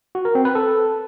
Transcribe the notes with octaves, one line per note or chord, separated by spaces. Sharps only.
F#4
A#4
C4
B4
A4